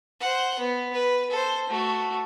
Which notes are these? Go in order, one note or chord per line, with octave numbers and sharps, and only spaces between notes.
C5 F#5
B3
B4
A4 C5
A3 F#4